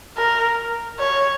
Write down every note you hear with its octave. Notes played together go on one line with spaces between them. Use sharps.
A#4
C#5